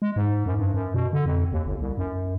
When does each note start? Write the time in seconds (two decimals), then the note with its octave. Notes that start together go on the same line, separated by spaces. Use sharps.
0.02 G#3
0.16 G#2
0.46 F#2
0.59 G2
0.74 F#2
0.94 B2
1.13 D3
1.26 F2
1.53 D#2
1.66 G1
1.81 C2
1.98 F#2